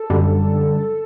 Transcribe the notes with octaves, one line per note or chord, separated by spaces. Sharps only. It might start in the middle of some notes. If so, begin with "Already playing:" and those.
Already playing: A4
F#2 D3 G3